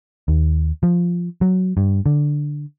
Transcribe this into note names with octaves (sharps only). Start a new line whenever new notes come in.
D#2
F3
F#3
G2
D3